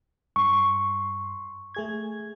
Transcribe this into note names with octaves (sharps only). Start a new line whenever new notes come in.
G2 C6 C#6
A3 G#4 G#6